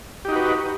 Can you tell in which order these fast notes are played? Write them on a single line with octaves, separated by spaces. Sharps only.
G4 D#4 F#4 B4